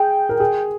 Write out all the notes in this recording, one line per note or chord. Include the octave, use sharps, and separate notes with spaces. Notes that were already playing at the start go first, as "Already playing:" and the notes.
Already playing: G#4 G5
A#4
G#4